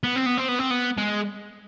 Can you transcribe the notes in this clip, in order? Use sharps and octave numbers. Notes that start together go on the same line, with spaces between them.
B3
C4
B3
C4
B3
C4
B3
G#3